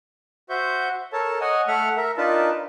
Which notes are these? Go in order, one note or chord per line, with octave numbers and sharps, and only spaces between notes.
F#4 C5 E5 C#6 G6
A4 A#4 C#5 A5
C#5 D#5 F#5 G#5
A3 E5 F#5 F6
A#4 E5
D4 D#4 F4 A#4 B4 A5